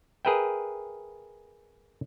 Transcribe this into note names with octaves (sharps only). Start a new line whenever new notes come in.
G#4 A#4 B4 E5 G5